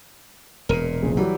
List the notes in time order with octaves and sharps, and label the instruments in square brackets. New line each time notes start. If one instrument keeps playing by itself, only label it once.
[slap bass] E1 A#2 [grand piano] A#4 D#7
[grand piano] A#1 C#3
[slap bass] E3 [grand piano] F#3 G3 G4